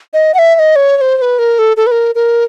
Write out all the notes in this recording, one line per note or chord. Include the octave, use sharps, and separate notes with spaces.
D#5
F#5
E5
E5
D#5
C#5
C#5
C5
C5
B4
A#4
A4
A4
B4
A#4
A#4